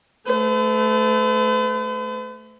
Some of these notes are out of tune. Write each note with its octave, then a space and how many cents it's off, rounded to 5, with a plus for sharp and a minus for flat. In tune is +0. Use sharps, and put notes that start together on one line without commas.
A3 -10 B4 +45